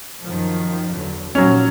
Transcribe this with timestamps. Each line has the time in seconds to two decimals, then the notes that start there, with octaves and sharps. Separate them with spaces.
0.22 F#2 D#3 F3
0.93 E2 D3 F#3
1.35 D#2 A#2 F3 F#3 C#4